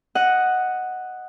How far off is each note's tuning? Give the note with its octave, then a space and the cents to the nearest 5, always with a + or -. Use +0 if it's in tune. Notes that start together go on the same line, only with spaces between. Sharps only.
D#5 +0 F#5 +0